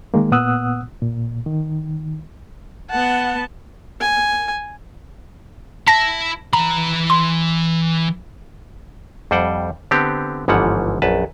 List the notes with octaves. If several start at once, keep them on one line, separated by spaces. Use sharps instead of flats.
D#3 G#3 A#3
A#2 B3 F#5 D#6 E6 F#6
A#2
D#3
B3 F#5 A5
G#5
E4 E5 A5 A#6
E3 A#5 B5
C6
F2 G3 C5 F#5 G5
D3 B3 C4 G4
G1 G#2 E3 F3 F#5
A#1 F#2 B4 A5